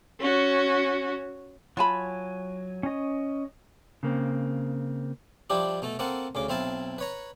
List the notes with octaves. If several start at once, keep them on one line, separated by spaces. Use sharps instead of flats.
C#4 F#4
F#3 F4 G#5 A5 B5
C#4 D#5
C#3 A#3 C4
F3 G3 D4 E4 G4
B2 A3 A4
A#3 C4 A4 F#5
D2 C#3 D6
B1 C4 E4 F5 A5
B4 C#5 A#5